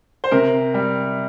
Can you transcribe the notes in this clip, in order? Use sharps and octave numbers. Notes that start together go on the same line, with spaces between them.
C5
C3 A#4
G3